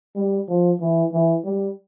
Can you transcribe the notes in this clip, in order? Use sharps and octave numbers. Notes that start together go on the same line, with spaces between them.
G3
F3
E3
E3
G3